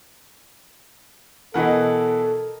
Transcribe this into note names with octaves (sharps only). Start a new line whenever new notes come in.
B2 E3 A4 A#4 D#5 F#5